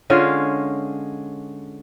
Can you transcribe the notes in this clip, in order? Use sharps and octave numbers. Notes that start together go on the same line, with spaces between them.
D3 G#3 C#4 F4